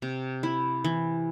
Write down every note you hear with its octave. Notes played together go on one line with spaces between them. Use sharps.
C3
E4
E3